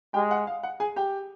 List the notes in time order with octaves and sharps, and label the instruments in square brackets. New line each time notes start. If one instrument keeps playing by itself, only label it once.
[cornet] G#3 [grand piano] G4 G5
[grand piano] F#5
F5
F#5
G#4 G#5
G4 G5